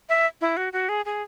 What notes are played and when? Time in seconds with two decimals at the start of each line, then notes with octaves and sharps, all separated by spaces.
0.09 E5
0.41 E4
0.57 F#4
0.73 F#4
0.89 G#4
1.05 G#4